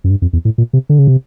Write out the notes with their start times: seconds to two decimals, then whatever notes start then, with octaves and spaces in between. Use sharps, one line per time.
0.04 F#2
0.11 G2
0.22 F2
0.33 E2
0.45 A2
0.58 A#2
0.73 C3
0.89 D3
0.99 C#3
1.07 C3